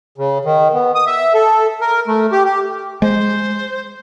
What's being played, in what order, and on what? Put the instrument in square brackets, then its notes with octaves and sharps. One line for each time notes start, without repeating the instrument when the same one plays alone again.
[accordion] C#3
D#3
B3
D#6
E5
A4
A#4
A3
G4
G4
[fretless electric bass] G#3 [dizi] C5